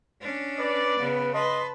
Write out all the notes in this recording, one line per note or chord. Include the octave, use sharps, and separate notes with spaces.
C#4 D4
B4 D5
C#3 B3
B4 D#5 A5 C6